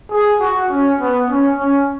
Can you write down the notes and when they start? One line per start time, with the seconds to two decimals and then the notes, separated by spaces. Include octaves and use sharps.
0.11 G#4
0.40 F#4
0.70 C#4
1.00 B3
1.30 C#4
1.60 C#4